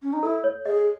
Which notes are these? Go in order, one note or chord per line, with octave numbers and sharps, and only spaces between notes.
C#4
D#4
E4 A4
C#5
G#4 D#5